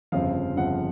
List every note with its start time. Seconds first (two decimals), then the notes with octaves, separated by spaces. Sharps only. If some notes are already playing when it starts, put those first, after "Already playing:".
0.12 G1 F2 C#3 F3 F5
0.57 G1 F2 C#3 F3 F#5